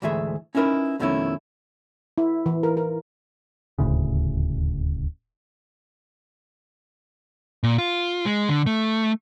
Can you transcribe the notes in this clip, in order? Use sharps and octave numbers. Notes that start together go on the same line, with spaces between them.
D2 G#2 E3 A3 G#4 E5
C#4 D#4 E4 A#4 B4
F2 B2 D#3 A3 C#4 E4
E4
E3
A#4
A#4
D#1 D2 A2 C#3
A#2
F4
G#3
D3
A3